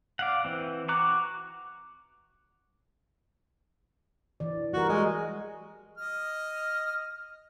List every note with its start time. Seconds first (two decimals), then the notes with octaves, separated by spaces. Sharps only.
0.19 D5 F5 F#5
0.44 E3 C4
0.88 F#4 A#5 D6 F#6
4.40 E3 D5
4.73 G3 F#4 A#4
4.89 G#3
5.98 D#5 F6